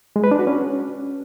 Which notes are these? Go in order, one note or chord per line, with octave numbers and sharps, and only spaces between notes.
G#3
B4
D4
F#4
C#4